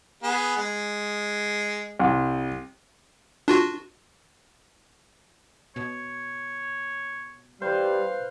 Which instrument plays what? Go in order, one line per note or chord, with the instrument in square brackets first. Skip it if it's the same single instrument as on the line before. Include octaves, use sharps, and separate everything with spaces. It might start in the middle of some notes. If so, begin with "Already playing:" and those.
[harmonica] B3 G#4
G#3
[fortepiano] C2
[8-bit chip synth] D4 F4 F#4
[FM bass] B2 [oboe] C#5
[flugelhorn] G3 [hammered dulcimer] B4 C5 [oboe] F5